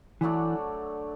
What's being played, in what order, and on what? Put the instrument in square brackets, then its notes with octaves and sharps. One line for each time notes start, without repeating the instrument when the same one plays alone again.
[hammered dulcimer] D3 F#3 A3 D4 [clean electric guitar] E3